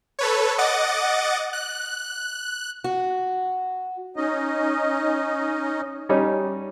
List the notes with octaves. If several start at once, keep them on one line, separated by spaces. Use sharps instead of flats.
A4 B4 C#5
D#5 F#5 D6 A6
F#6
F#4
C#4 D#4 D#5
G3 C#4 D#4